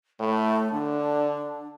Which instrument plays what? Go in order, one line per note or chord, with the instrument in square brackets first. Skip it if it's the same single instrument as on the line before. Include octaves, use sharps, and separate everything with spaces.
[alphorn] A2 [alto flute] A3
[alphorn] D3 [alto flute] D4